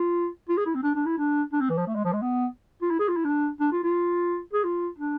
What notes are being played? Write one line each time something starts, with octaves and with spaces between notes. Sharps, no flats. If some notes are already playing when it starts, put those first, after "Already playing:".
Already playing: F4
F4
G#4
E4
C4
D4
D4
E4
D4
D4
C4
E3
F3
A3
G#3
F3
G#3
B3
F4
E4
G#4
F4
E4
D4
D4
F4
F4
G#4
F4
D4